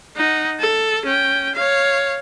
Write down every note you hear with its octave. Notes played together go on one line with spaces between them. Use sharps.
D#4 F#5
A4
C#4 G5
C#5 F5